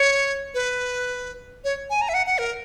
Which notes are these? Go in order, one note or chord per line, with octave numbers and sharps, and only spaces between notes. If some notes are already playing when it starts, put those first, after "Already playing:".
Already playing: C#5
B4
C#5
G#5
A#5
E5
F#5
F#5
A#4